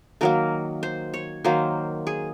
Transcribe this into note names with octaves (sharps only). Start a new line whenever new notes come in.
D#3 F#3 A#3 A#4
C5
C#5
D#3 F#3 A#3 C5
G#4